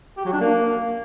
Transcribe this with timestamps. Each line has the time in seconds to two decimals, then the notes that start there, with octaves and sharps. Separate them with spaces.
0.17 G4
0.25 F#3
0.33 D4
0.41 A#3